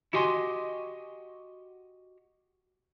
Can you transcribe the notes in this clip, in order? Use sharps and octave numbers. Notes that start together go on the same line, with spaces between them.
E4 F#4 G4 D#5 G#5 C6